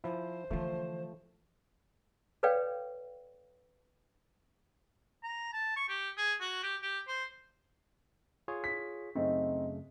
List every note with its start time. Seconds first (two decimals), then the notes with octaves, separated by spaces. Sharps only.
0.04 F3 E4 C5
0.51 D3 E3 F3 A3
2.43 A4 B4 C#5 D5 F5 G5
5.24 A#5
5.53 A5
5.76 C#6
5.89 G4
6.17 G#4
6.41 F#4
6.63 G4
6.82 G4
7.08 C5
8.48 F4 G#4 C#5
8.64 B6
9.15 F#2 C#3 A3 C4 D#4